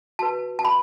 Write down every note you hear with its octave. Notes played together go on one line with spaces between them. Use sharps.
F#4 B4 A5
A5
B5